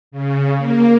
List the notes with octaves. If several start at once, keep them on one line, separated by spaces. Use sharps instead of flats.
C#3
A#3